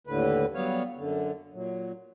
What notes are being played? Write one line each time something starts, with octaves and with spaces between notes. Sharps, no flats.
D#2 A2 D3 B4
F#3 G3 B3 C#5 F5
F#2 D3
A#2 F#3